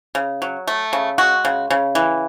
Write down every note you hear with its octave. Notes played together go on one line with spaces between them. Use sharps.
C#3
F#3
A3
C#3
G#3 F#4
C#3
C#3
E3